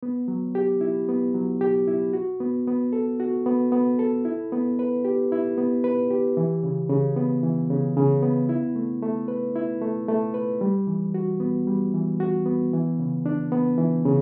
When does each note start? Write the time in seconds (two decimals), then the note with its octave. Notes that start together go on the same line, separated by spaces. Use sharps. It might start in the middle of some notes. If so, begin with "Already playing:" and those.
0.03 B3
0.28 F#3
0.55 G4
0.81 E4
1.09 B3
1.35 F#3
1.61 G4
1.88 E4
2.13 F#4
2.40 B3
2.67 B3
2.93 A4
3.20 F#4
3.46 B3
3.72 B3
3.99 A4
4.25 E4
4.52 B3
4.79 B4
5.05 G4
5.32 E4
5.58 B3
5.84 B4
6.10 G4
6.37 E3
6.63 C#3
6.90 C#3
7.17 B3
7.43 E3
7.70 C#3
7.97 C#3
8.22 B3
8.49 E4
8.76 A3
9.03 A3
9.28 B4
9.56 E4
9.82 A3
10.08 A3
10.34 B4
10.61 G3
10.87 E3
11.14 F#4
11.40 B3
11.67 G3
11.94 E3
12.20 F#4
12.46 B3
12.73 E3
12.99 C#3
13.26 D4
13.52 B3
13.78 E3
14.05 C#3